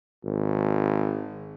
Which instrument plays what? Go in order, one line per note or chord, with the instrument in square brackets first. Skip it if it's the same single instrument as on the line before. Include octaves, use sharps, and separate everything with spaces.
[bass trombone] G#1